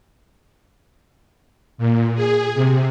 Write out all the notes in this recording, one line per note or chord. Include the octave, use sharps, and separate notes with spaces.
A#2
G#4
C3